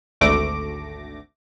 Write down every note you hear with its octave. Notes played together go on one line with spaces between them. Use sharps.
G#1 D2 A3 D6 A#6